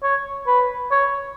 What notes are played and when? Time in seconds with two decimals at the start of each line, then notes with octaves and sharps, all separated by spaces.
0.03 C#5
0.47 B4
0.92 C#5